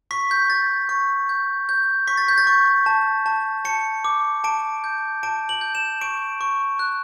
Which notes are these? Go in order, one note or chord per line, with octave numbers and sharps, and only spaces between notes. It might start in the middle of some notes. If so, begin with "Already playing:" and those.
C#6 B6
G6
G6 A6
C#6
G6
G6
C#6 B6
A6
G6
A6
C#6
A5
A5
A5 C#7
D6
A5 D7
G6
A5 D7
F#7
G6
E7
C#6 D7
C#6
F#6